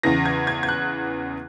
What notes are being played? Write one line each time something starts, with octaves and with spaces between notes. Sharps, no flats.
E2 C#3 E3 A#6
G#6
G#6
G#6
F#6